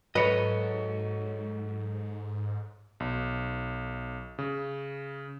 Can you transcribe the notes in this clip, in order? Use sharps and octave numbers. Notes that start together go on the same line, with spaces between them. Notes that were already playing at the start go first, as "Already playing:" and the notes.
G#2 F#3 A4 B4 C#5 D#5
B1
C#3